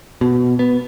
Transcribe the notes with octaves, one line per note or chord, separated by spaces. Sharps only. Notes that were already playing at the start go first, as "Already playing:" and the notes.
B2
B3